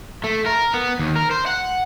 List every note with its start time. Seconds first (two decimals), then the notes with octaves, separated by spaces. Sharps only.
0.24 A3
0.47 A#4
0.74 B3
0.99 D#2
1.16 A#4
1.31 C5
1.46 F#5